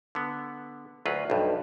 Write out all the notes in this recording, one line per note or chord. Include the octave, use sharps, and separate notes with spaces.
D3 B3
D2 F#3 F4 B4
B1 G2